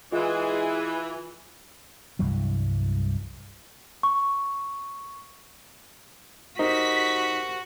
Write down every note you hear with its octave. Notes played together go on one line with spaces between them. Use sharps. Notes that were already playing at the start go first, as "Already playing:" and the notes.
E3 G#3 F4 G#4
C2 G2 E3 F#3
C#6
D#4 F#4 G4 A#4 C5 B6